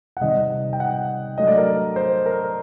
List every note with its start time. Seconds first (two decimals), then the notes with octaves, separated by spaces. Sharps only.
0.17 F#5
0.21 C3 D#3 G3 D#5
0.73 G5
0.80 F#5
1.38 F#3 A3 D4 D#5
1.47 D5
1.58 A#4
1.96 C5
2.26 A#4